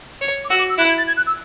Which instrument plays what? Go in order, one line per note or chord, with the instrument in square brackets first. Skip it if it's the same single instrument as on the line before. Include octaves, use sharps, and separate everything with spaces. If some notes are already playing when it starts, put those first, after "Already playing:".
[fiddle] C#5
[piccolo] D6
[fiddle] F#4 [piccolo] E6
[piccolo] D6
E6
[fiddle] E4 [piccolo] F#6
[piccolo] G#6
A6
G#6
F#6
E6